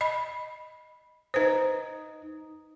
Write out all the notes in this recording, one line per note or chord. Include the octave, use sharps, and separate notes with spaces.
D#5 B5
D#4 B4 C5 D#6